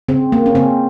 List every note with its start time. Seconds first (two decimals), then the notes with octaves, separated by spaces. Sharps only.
0.09 C#3 C4
0.32 A#3
0.46 C#4
0.55 C#3 C4